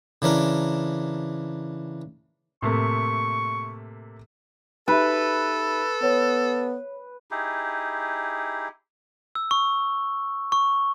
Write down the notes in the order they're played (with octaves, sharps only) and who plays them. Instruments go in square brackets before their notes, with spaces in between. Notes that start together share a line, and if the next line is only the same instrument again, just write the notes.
[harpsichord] C#3 E3 D4 A#4
[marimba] A2 [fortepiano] C3 A3 A#3 [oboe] C#6
[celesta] D#4 G4 E5 [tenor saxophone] A4 [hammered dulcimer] B4
[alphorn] B3 [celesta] C#5
[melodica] D#4 E4 G4 G#4
[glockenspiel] E6
C#6
C#6